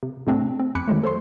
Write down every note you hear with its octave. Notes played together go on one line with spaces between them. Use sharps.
C3
A2 C3 A3 C4 D4
C4
F2 G#5 B5 D6 F#6 C#7
D#3 F#3 G#3 A3
A4 C5 C#5 C6